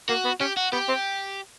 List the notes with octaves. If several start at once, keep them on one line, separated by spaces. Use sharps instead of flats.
A#3 F#4
B3
C#4 G4
F#4
B3 G4
C4